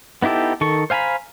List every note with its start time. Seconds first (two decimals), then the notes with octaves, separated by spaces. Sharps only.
0.22 B3 D#4 E4 G4 A4
0.61 D#3 A4 C#6
0.90 C5 F5 G#5 A#5 B5